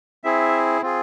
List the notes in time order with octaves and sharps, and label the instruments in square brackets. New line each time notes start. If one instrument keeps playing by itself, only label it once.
[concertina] C4 E4 G#4 E5
C4 F4 G#4